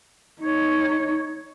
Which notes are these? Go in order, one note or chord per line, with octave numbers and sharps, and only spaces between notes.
D#4 C#5